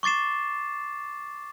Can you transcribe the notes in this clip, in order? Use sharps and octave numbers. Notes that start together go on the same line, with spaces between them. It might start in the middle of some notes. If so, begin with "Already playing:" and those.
C#6 D6 A6 C7 E7